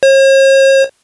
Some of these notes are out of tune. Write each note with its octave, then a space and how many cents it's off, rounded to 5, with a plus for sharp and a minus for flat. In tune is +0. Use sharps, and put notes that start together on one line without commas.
C#5 -45